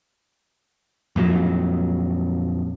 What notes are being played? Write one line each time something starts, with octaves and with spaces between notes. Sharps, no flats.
F2 A#2 F#3